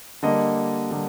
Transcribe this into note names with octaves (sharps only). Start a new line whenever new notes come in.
D3 G3 A#3 D#5
D3 G3 A#3